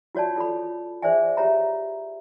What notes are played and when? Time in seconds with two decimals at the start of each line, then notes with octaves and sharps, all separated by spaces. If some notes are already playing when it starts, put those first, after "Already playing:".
0.15 F4 F#4 C#5 D5 A5
0.36 F4 A4 C#5 B5
1.02 G#4 C5 D5 E5 G#5
1.37 G4 C#5 E5 A#5 B5